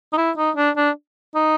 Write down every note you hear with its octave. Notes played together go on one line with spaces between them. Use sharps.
D#4
E4
D#4
D4
D4
D#4